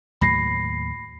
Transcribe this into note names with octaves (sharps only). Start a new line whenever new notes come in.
D#2 A2 F#3 B5 A#6 C7